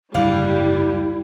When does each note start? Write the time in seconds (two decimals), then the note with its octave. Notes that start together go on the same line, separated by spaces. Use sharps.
0.14 F#1 D2 G#2 G3 D4 E4 F5